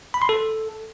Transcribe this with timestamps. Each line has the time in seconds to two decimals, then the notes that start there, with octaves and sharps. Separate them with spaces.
0.14 B5
0.22 C6
0.29 A4